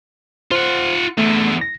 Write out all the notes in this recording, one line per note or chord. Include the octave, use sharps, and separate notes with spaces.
F4 C5 F#5
E2 D3 A3
A#6